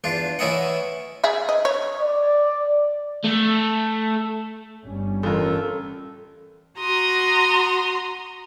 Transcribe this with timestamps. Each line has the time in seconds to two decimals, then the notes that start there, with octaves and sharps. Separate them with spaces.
0.04 E2 D4 F4
0.39 E3 C#4 E4 D#5 F#5
1.24 G#4 E5
1.49 D#5
1.65 C#5
2.00 D5
3.24 A3
4.84 G1 G3 C#4
5.23 A1 F4 A4 A#4
6.78 F#4 A#5 C6 D#6